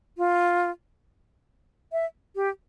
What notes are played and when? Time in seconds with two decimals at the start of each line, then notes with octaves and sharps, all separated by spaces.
0.18 F4
1.92 E5
2.36 G4